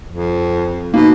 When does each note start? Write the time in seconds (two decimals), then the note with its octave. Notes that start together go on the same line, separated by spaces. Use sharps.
0.09 F2
0.94 B2 A#3 D#4